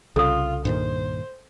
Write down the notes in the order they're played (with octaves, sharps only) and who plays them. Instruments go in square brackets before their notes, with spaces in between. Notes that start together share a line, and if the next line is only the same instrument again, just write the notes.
[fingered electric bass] C2 [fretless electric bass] C#3 [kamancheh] F4 [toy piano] A4 D#6
[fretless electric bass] G2 A#2 D#3 [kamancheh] C5